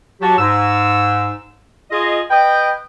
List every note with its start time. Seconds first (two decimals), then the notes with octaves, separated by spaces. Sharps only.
0.21 F#3 F#4 G4 A5
0.38 G#2 E6
1.91 F4 G#4 D#5
2.30 B4 D#5 G5